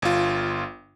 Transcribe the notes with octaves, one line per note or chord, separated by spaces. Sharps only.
G1 F4